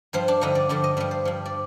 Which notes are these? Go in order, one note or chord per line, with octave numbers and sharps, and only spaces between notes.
G2 F3 C5
D4
G2 D3 F3 D#4
D5
G2 D3 F3 D5
D#5
G2 F3 D5
C5
G2 F3
D5